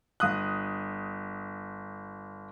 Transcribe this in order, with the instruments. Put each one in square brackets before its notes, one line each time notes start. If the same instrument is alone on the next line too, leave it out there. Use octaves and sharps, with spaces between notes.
[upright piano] G1 D#6 F#6